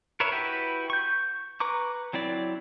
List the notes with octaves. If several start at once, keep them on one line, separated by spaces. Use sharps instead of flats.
A#4 B4 C#5 E5
E4 F#4 G4 B4
C#6 G6
B4 A#5 C#6 D6
F#3 C4 E4 D5